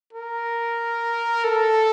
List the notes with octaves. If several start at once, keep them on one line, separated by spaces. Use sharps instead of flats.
A#4
A4